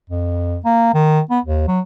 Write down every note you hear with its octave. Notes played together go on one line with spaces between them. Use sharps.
F2
A#3
D#3
B3
D#2
F#3